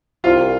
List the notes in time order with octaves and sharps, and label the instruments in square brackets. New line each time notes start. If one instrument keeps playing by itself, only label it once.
[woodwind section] C2 [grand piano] F4